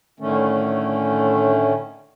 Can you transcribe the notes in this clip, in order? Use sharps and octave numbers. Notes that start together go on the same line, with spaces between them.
A2 D3 D#3 A3 C#4